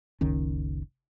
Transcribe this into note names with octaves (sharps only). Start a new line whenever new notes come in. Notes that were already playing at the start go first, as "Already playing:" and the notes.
F#1 C#2 D#3 C#4